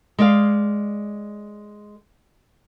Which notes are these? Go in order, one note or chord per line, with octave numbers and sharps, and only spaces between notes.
G#3 D5 F5